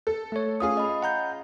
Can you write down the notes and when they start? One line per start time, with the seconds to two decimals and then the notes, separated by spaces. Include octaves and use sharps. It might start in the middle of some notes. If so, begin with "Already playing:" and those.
0.07 A4
0.32 A3 C#5
0.60 C#4 F4 G#4 D#6
0.77 D#5 B5
1.03 F#5 A#5 G6